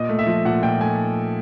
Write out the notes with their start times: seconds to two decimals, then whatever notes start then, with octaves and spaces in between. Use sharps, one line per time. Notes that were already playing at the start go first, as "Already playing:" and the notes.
Already playing: A#2 D#5
0.09 A3
0.19 E5
0.27 F3
0.45 A#2 F#5
0.62 A#2 G5
0.81 A3 G#5